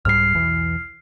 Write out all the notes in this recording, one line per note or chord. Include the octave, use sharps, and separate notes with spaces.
C2 G#2 G3 F6 C7
B1 E2 E3